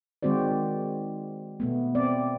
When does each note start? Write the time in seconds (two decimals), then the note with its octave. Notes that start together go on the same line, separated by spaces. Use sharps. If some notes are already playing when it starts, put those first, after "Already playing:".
0.23 D#3 G#3 C4 F#4 C5 D5
1.60 B2 A3 B3
1.95 C4 D5